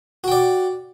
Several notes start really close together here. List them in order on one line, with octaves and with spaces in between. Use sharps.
F#4 G5 D5